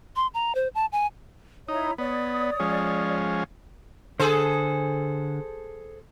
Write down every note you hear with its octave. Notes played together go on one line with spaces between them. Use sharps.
C6
A#5
C5
A5
G#5
D#4 E4 C#5 A#5
B3 C#5 D5 D#6
F3 G#3 C#4
D3 G#4 A4 C5